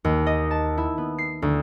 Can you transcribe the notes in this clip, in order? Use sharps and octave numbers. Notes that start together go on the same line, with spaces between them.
D#2
D#5
A5
E4
B3
C7
D2